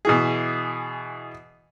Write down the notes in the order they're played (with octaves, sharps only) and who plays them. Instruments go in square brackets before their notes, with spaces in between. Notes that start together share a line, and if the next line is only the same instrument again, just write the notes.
[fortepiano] B2 E3 G#4